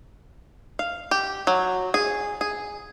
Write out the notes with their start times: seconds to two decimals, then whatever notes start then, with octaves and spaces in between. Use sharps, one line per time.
0.79 F5
1.11 G4
1.47 F#3
1.94 G#4
2.41 G#4